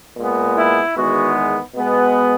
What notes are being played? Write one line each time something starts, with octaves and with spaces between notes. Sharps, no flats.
A#2 G#3 B3
E4
E2 D#3 G#3 B3 F#4
B2 G#3 B3